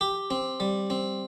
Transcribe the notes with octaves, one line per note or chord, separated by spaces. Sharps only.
G4
C4
G3
C4